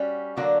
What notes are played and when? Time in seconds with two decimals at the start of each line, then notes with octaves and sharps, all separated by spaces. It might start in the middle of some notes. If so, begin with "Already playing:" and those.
Already playing: G3 C#4 F#4
0.37 D3 F#3 A#3 D4 F#4